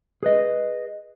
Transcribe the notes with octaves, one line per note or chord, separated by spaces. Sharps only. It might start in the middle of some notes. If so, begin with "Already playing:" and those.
G#4 B4 D#5